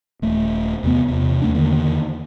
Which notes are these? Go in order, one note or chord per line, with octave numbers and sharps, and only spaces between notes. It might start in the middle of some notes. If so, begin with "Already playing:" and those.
D#1 A3
E2 C3 B3
E2 C3
D#2 A3 D4
E2 D3 D#3 A#3